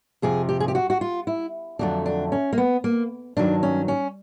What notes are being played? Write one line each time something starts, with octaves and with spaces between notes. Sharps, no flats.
F2 C3 F3 G#4
G4
G#4
G4
F#4
F#4
F4
E4
F2 D3 F#3 A3 D4
D4
C#4
A#3
B3
A#3
G2 D#3 F#3 D4
C#4
C#4